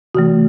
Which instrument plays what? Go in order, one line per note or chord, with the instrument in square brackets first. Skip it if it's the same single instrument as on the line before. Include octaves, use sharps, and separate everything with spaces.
[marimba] C3 E3 A3 F#4